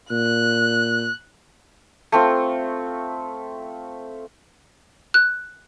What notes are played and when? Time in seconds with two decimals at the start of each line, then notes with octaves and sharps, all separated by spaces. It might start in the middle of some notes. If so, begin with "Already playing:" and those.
0.11 A#2 F#6
2.12 A3 C4 F4
5.14 F#6